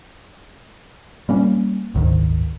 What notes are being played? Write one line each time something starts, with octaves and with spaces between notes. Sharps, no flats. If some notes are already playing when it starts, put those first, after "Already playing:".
G3 A#3 C#4
F#1 D2 G#2 D#3